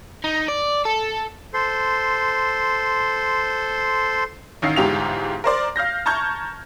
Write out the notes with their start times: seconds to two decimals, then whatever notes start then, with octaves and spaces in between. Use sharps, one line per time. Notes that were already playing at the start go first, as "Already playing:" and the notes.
0.24 D#4
0.48 D5
0.85 A4
1.54 A4 C5 C6
4.62 A1 D#3 F5 C7
4.76 G1 E2 G#2 G4 F5 F7
5.44 A#4 C5 D5
5.76 F5 F6 G6 A#6
6.06 A5 A#5 C#6 F6 G6 G#6